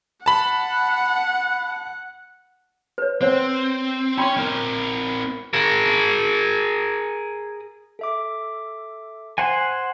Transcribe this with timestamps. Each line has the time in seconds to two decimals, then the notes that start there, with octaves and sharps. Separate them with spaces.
0.26 F#5 A5 B5
2.98 B4 C#5
3.21 C4 C5 C#5 F#5
4.18 C#4 C#5 G5 B5 C6
4.37 C4 A#4
5.53 G#4 A#4
7.99 A4 E5 D6
9.38 C5 F#5 G#5